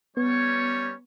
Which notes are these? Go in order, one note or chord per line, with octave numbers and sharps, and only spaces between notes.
G3 B3 C#4 C#5